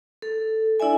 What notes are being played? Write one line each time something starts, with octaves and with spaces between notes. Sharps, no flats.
A4
D4 E4 D5 E5 G#5